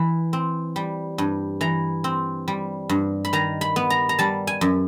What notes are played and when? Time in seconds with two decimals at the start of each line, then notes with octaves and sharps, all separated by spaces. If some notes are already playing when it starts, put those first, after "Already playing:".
Already playing: E3 B5
0.33 C4
0.76 G3
1.18 G2
1.61 E3 A#5
2.04 C4
2.48 G3
2.89 G2
3.25 B5
3.33 D#3 A#5
3.61 B5
3.76 B3
3.90 A#5
4.09 A#5
4.19 G3 A5
4.47 G#5
4.61 F#2